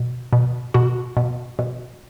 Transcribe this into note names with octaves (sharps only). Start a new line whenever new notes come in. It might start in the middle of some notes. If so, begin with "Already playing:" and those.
Already playing: B2
B2
B2 F#4
B2
B2